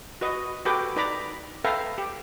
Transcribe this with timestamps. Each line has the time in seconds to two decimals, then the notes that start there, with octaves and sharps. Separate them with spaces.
0.21 F#4 B4 D#5
0.65 F#4 G4 A4 B4 G5 D6
0.96 D#4 B4 D5 A#5 B5 D6
1.64 A4 B4 E5 F5 G5 A#5
1.98 G4